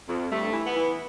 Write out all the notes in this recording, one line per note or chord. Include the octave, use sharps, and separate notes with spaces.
F2
G2 A3
E3
B3
E3